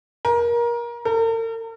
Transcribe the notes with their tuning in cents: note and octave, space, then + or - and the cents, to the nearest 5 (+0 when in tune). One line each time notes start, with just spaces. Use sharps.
A#4 +25
A#4 -45